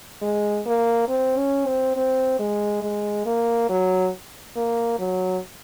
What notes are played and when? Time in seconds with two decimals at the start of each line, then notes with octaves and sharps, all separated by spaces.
0.22 G#3
0.66 A#3
1.09 C4
1.37 C#4
1.66 C4
1.96 C4
2.39 G#3
2.82 G#3
3.26 A#3
3.69 F#3
4.56 A#3
4.99 F#3